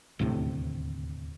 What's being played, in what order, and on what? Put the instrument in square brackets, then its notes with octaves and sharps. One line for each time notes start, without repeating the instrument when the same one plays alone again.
[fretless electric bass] D#1 D2 A2 C3